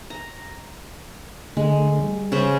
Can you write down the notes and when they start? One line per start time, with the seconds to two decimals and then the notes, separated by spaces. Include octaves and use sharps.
0.10 A#5
1.57 D3 G#3 A3
2.03 G3
2.32 C#3 B4 C5